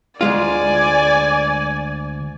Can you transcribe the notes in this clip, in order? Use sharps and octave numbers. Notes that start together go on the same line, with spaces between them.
D2 G#3 F4 D5 G#5